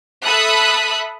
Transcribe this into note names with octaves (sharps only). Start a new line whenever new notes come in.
A4 E5 B5 D#6 F#6